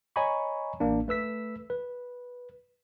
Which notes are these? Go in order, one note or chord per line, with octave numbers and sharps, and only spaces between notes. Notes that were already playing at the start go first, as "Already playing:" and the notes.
C#5 D#5 G#5 A#5 B5 C#6
A1 A#3 D4
A3 B4 E6 B6
B4